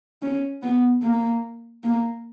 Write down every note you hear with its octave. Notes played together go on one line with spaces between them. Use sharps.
C#4
B3
A#3
A#3